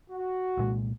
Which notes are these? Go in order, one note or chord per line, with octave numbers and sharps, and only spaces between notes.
F#4
C2 A#2 G#3